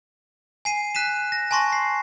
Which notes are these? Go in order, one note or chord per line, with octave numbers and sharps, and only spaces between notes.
G#5 C7 D#7
F#6 B6 D#7 E7
A#6
G#5 A5 C6 C#6 A#6
C7